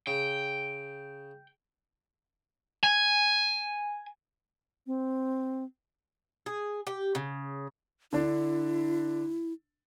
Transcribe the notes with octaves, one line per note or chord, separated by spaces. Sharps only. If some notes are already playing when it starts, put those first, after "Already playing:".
C#3 G5
G#5
C4
G#4
G4
C#3
D3 D4 E4